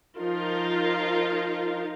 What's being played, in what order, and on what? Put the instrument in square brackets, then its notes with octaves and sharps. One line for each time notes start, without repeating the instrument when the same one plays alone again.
[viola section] F3 D#4 F4 A#4